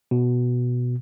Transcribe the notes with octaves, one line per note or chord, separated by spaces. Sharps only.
B2